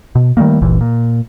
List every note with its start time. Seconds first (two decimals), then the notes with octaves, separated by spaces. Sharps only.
0.15 B2
0.37 D#3 G3 A3 A#3
0.61 G1 C#2 A#2 E3
0.81 A#2